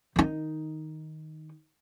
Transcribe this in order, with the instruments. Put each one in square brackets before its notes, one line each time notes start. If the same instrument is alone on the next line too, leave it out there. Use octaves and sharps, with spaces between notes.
[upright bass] D#3 D#4